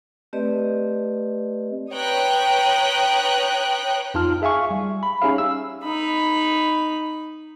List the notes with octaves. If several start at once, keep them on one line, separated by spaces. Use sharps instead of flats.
A3 C4 G4 B4 D5 D#5
B4 C#5 G5 A#5 D#6 F#6
F2 D#4 F4 A5 F6
G#4 E5 F5 G#5 C#6
G3
B5
C#4 D#4 G4 G#4 E5 F5
E6
D#4 B5